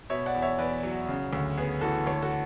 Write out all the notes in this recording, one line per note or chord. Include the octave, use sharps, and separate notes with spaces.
B2 C#5 E5
D5 F#5
E2
C#5 E5
E2 B4 D5
F#3
F#4
C#3
D2
B3 G#4
E3 F#4 A4
D2 A4 C#5
F#4 A4